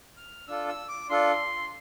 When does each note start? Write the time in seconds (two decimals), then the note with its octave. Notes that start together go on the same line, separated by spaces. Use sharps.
0.17 F6
0.48 D4 F4 A4 E6
0.68 E6
0.89 D6
1.10 D4 F4 A4 C6